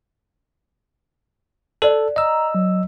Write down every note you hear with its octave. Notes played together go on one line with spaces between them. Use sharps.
A4 C5 D5
D#5 A#5 E6
F#3